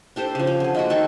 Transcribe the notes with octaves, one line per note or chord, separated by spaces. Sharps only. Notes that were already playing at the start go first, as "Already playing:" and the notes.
D4 G4 A4 C5
C#3 F3
C#4
D3 G#4
G#3 A#3 F#4
D#3 A4 C#6